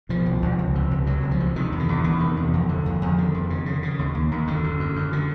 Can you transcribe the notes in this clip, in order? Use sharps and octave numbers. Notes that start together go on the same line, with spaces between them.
B2 F3
C2
C2
C#2
C3
C#2
C3 F#3
C#2
F3
C3
C3 D#3
E2
D3
E2
E2 D#3
C3
E2
F2
D3
F2
F2 D#3
D3
F2
C#3
C#3
C#3
D#2
D#2
D#2
F#2 D3
F#2
F#2
F#2
D3